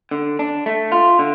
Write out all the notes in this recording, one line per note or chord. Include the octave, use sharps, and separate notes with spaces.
D3
D4
A3
F4
D3